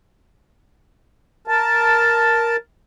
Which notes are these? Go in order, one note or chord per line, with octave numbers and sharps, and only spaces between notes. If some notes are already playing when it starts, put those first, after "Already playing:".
A#4 A5